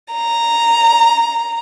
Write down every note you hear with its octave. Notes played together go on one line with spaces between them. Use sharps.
A#5